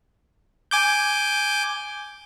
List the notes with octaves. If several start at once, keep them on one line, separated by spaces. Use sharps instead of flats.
G#5 D6 G6